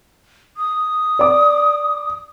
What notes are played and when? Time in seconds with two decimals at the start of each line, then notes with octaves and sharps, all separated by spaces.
0.57 D#6
1.19 D5 D6